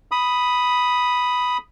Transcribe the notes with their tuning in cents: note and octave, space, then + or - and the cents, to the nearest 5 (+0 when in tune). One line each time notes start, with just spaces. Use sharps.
B5 +0 D#6 +0